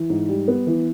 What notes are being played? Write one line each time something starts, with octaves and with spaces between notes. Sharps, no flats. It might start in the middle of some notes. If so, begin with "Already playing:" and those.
Already playing: E3
G#2
G3
B3
E3